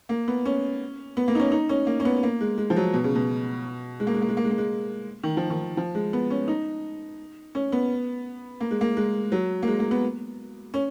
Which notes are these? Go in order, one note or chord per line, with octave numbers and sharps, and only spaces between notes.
A#3
B3
C#4
B3
A#3
D#4
C#4
D#4
C#4
A#3
C#4
B3
A#3
G#3
G#3
F3
F#3
B2
C#3
B2
G#3
A#3
G#3
A#3
G#3
A#3
G#3
A#3
G#3
D#3
F3
D#3
F3
G#3
B3
C#4
D#4
C#4
B3
A#3
G#3
A#3
G#3
F#3
A#3
G#3
A#3
B3
C#4